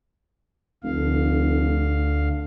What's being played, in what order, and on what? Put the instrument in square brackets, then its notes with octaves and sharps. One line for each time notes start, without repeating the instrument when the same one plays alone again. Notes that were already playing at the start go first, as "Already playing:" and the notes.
[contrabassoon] F1 [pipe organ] D2 D3 F5